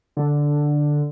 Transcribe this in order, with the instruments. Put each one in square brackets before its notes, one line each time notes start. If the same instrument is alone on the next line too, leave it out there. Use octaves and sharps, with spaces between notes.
[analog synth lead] D3